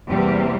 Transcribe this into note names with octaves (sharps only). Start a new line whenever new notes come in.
E2 C3 E3 G3 A#3 G4